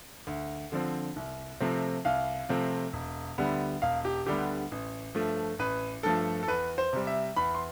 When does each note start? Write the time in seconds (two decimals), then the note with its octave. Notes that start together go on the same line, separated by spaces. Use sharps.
0.27 D2
0.72 D3 F3 C4
1.16 C2
1.60 C3 F3 A3 C4
2.05 C2 F5
2.49 C3 F3 A3 C4
2.93 E1
3.38 D2 D3 G3 B3
3.82 E1 F5
4.05 G4
4.26 D2 D3 G3 B3 G4
4.71 A1
5.15 G2 F3 A3
5.59 A1 B4
6.03 G2 F3 A3 A4
6.43 A4
6.48 E2 B4
6.78 C5
6.93 C3 G3
7.07 E5
7.36 E2 B5
7.55 C6